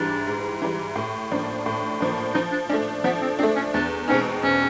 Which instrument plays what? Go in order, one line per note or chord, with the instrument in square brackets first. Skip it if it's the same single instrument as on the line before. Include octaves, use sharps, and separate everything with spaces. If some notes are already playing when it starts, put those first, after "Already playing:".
Already playing: [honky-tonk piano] G#2 E3 G3 [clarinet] D4
[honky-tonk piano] G#2
E3 G3
A2
F3 A#3 D4
A2
F3 A#3 D4
[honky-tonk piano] F3 [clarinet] D#4
[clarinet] D4
[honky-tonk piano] A3 D4 [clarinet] C#4
[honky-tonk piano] F3 [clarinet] B3
[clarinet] C4
[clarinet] C4 [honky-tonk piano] D4
[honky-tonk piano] A3
[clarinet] C#4
[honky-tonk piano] E2 [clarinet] D4
[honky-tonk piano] B2 G#3 C4 D#4 [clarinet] C#4
[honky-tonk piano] E2 [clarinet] C#4